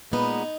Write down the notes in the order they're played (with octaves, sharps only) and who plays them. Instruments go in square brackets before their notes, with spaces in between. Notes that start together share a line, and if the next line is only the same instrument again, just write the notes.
[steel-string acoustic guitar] A#2 G#3 B3 D#4